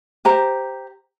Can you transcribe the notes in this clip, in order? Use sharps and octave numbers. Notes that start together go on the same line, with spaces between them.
G4 C5 A#5